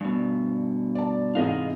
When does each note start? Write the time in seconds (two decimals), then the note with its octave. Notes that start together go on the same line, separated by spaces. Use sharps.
0.01 G2 B2
0.95 D5 A5
1.35 G#2 C3 E3 G#4 D#5 F5